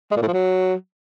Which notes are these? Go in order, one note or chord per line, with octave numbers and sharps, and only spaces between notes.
G#3
A#2
A2
F3
F#3